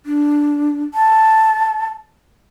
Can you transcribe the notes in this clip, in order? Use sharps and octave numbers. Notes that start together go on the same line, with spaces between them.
D4
A5